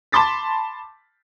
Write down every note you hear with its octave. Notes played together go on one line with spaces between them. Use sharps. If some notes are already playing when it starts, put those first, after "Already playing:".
A5 B5 C6 D6 A6 B6